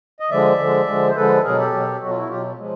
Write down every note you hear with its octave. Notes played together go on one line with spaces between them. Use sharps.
D#5
D3 F3 G#3 D5 E5
D3 F3 G#3
D3 F3 G#3
C5
D3 F3 G#3 A4 B4
B2 F#3 G#4 A#4
G4 A4
B2 F#3
B2 F#3 F#4
F4
E4 F#4
B2 F#3 F4 G4
F3 G#3